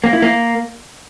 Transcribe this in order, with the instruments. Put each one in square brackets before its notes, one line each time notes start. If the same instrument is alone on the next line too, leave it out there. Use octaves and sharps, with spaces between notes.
[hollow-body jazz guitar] A#3
E4
A#3